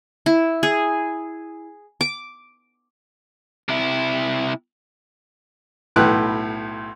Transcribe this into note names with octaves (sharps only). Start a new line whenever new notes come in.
E4
G#4
D6
C3 E4
B1 A2 B4 G5 F#6